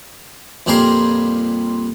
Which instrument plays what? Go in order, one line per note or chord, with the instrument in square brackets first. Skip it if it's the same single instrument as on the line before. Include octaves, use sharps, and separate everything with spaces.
[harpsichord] F2 A#2 G3 G#4 A#4 C6